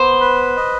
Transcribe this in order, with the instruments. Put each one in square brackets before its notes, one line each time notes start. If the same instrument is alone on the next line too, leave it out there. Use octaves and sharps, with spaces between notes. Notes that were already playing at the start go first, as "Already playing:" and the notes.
Already playing: [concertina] B3 [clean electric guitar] C5
[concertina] B4
D#5